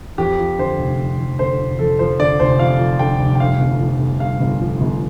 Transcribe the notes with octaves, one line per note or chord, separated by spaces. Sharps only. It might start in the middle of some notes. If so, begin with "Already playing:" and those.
F2 G4
F3
D3 C5
F1
F2
F3
D3 C5
F1
F2 A4
F3 C5
D3 D5
F1 C5
F2 F5
F3
D3 G5
F1
G5
G2 F5
G1
F3
G1
G2 F5
G1
F3
G1